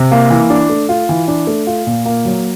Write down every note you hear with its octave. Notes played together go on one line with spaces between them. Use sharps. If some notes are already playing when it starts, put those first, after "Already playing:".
Already playing: C3
A#3
E3
D4
A3
F4
E3
D4
A3
F4
A#2
A#3
F#3